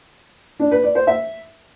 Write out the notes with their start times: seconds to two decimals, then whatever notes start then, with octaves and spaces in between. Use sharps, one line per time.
0.60 D4
0.71 B4
0.83 D5
0.95 C5
1.07 E5